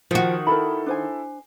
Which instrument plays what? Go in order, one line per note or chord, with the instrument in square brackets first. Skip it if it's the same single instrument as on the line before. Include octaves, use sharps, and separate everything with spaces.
[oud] D#3 F#4 [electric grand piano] F3
[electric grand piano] E4 A4 [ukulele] A#4 B5
[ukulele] D4 C5 G#5